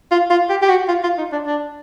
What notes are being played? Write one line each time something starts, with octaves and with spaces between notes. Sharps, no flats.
F4
F4
G4
G4
F#4
F4
F4
D#4
D4
D4